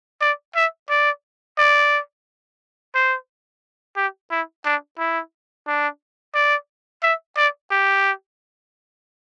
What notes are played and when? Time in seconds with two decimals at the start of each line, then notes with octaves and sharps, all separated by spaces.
0.21 D5
0.56 E5
0.90 D5
1.58 D5
2.95 C5
3.96 G4
4.31 E4
4.65 D4
4.99 E4
5.67 D4
6.34 D5
7.03 E5
7.37 D5
7.70 G4